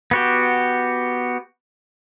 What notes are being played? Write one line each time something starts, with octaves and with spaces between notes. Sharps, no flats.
B3 F#4 G4